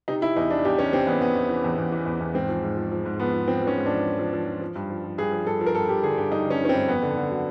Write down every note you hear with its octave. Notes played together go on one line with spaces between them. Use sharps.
C3 D#4
C3 E4
E2 D#4
E3 D4
E2 G4
C3 C#4
C3 C4
E2 B3
E2 B3
E2
E3
E2
E2
E3
E2
E2
G#2 C4
F3
G#2
F3
F3
G#2
F3 B3
F3
F3 C4
F3 C#4
G#2
F3 D4
F3
F3
F3
F3
F3
G2
F3
F3
G2 G#4
F3
G2 A4
F3
A#4
G2 A4
G2 G4
D3 G#4
G2 G4
G2 D#4
D3 C#4
F3
C#4
C4
G2
F2 B3
D3
D3
F#3